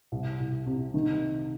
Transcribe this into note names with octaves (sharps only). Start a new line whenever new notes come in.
C2
C2
C3
D#3